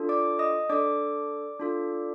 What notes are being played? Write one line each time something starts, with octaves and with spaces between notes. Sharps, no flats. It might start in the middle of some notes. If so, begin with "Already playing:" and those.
Already playing: D4 F4 A4
D5 D6
D#5 D#6
D4 A4 D5 D6
D4 F4 A4